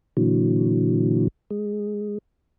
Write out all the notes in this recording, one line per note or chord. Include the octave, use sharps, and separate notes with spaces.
A#2 D3 E3 F#3
G#3